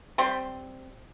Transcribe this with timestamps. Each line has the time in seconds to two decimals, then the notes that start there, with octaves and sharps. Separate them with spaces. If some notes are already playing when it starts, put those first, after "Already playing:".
0.18 G3 C4 C6